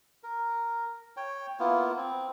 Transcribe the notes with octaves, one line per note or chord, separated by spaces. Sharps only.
A#4
C#5 G5
A#3 B3 E4 F4
C4